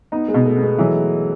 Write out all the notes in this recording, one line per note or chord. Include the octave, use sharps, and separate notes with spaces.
B3 D#4
G#3
B2
A3
B3
G#3
E3 F#3